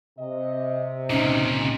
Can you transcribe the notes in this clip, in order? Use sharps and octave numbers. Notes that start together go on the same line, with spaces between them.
C3 D#5
C#2 A#2 C#4 D#4